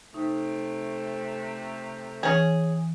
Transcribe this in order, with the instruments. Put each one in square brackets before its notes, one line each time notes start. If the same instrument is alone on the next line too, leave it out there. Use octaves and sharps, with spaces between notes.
[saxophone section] C3 A3 [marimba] D#4
[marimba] E3 [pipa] C#4 G#4